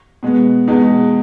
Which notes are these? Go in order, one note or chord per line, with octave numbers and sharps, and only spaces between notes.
B2 G#3 B3
E2 B2 G#3 B3 D#4